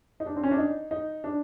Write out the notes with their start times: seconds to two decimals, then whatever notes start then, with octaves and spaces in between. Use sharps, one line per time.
0.20 D#4
0.26 D4
0.37 C4
0.43 C#4
0.51 D4
0.58 D#4
0.91 D#4
1.24 D4